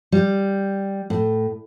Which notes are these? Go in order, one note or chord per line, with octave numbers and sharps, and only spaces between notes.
G3
A2